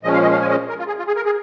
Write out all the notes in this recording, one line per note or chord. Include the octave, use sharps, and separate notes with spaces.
A#2 F3 G#3 C#4 D#5
F5
D#5
F5
G#5
D#5
A#4
F4
G#4
F4
G#4
A#4
G#4